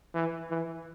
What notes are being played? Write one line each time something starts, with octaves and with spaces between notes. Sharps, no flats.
E3
E3